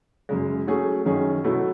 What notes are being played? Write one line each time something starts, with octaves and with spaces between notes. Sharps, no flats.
F#2 C#3 G#3
F#3 A3 C#4 G#4
F#2 D#3 F#3 C#4 G#4
B2 F#3 A3 E4